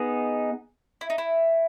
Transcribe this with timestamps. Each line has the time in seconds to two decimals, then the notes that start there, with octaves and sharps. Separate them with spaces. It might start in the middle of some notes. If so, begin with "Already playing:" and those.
Already playing: B3 D#4 G#4
1.01 E4
1.10 D#4
1.18 E4